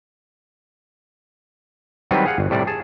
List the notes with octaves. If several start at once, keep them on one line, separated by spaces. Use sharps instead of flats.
D#3 F#3 G3 C4 B4
G#4 F5 F#5
G1
A2 C3 G3 D5
G#4 A5